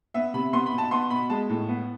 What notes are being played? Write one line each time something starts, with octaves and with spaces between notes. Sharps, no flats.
B3 E5
C3 B5
B3 C6
B5
B2
A5
B3 C6
B2 B5
G#3 A5
A2
B3